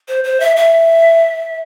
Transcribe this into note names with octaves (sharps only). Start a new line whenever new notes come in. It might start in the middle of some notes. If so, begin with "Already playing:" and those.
C5
C5
E5
E5